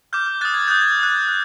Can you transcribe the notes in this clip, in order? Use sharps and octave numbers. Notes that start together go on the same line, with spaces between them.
D6 F6 G6
G6
D#6 F#6 A6
G#6
D#6 F#6 G6
G#6
D#6 F#6
F#6